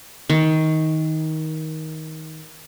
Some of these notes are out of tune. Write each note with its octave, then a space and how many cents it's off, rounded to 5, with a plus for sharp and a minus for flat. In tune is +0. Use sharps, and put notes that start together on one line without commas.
D#3 +20